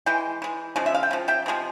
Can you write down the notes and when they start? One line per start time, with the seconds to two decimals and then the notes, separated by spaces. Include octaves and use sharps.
0.06 E3 G#3 G5
0.42 E3 G#3
0.76 C#3 F3 G#3
0.86 E5
0.95 F5
1.03 G5
1.11 C#3 F3
1.28 E5 G5
1.46 C3 F3 G#3